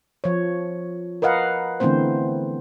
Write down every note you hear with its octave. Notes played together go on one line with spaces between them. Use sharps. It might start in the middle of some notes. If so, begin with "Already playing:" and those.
F3 C#5
A#4 B4 D#5 F5 F#5
D3 E3 A3 B3 C4 C5